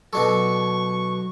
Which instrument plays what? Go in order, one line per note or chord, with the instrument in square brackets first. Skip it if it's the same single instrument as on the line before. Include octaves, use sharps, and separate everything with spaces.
[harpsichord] B2 D4 A4 [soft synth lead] F#3 [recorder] C#6